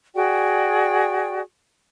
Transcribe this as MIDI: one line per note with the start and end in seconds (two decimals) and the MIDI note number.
0.15 1.40 66
0.15 1.40 68
0.15 1.40 74
0.15 1.40 79